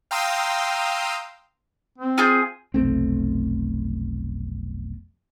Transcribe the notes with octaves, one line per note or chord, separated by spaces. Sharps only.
F5 G5 A#5 C6 D#6 E6
C4
F4 G#4 G6
F1 B1 A3 C4